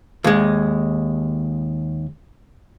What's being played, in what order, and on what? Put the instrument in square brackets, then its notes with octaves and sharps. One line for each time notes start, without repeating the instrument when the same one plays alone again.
[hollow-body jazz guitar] D#2 G#3